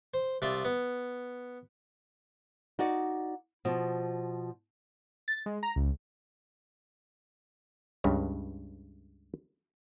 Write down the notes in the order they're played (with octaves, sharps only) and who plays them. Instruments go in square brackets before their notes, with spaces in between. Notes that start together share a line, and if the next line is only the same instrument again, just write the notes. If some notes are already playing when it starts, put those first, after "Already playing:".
[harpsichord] C5
C2 F4 D5 E5 C6
B3
[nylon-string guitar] D#4 F#4 D5
B2 F3
[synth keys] A6
G#3
A#5
C#2
[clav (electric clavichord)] C#2 G2 C#3